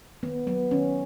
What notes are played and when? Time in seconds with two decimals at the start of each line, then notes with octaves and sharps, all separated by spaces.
0.23 D#3 B3
0.47 F#3 A#3 B3
0.71 D#3 C#4